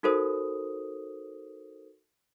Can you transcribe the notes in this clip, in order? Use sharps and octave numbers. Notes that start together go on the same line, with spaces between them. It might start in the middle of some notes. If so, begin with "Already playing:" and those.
D#4 F#4 A4 A#4 C5 D#6